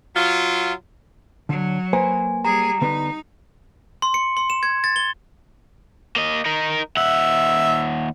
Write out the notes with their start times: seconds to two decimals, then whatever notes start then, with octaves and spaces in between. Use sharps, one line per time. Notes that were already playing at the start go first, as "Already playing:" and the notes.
0.16 F#3 F4
1.49 D3 F#3
1.93 A#3 B4 C5 G#5
2.45 G3 G#4 A#5
2.81 D3 B3 D#4 B4
4.02 C6
4.14 C#7
4.37 C6
4.50 E7
4.63 G#6
4.84 A6
4.96 G7
6.16 A#3 D#5
6.45 D#4 A#4
6.97 D#2 E5 F#5